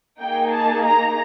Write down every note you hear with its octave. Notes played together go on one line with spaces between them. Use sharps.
A#3 D#4 G#4 G5
A5
A#5